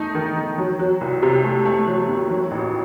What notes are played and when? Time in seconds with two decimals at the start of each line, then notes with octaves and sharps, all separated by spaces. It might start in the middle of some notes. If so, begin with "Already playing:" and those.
Already playing: A3 D#4
0.15 D#3
0.36 D#3
0.58 F#3
0.79 F#3
1.01 C2
1.23 C3
1.44 A3
1.65 A3
1.87 F#3
2.09 D#2
2.30 F#3
2.51 A1